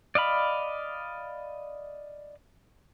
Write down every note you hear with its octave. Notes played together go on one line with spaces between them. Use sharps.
D5 D#5 F5 B5